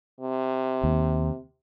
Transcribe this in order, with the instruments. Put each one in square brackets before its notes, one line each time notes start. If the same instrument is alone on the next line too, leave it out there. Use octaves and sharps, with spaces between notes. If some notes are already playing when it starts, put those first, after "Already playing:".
[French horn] C3
[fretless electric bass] D#2